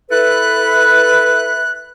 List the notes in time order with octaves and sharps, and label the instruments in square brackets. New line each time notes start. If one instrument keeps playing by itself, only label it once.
[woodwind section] E4 A4 B4 [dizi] F#6